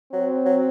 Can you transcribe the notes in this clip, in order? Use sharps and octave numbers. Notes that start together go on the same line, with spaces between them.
F#3 C4
F#3